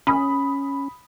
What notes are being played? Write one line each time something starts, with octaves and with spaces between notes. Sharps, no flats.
C#4 B5 D#6